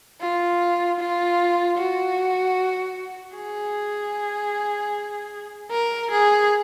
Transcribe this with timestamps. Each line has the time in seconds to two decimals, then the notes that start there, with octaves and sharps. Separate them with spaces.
0.21 F4
1.00 F4
1.78 F#4
3.36 G#4
5.71 A#4
6.11 G#4